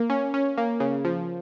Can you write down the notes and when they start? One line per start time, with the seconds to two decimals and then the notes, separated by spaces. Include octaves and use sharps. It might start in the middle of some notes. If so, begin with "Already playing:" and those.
Already playing: A#3
0.10 C#4
0.34 C#4
0.58 A#3
0.80 C#3
1.05 F3